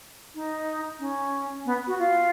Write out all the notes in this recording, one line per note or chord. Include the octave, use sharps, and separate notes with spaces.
D#4
C#4
B3
F#4
F4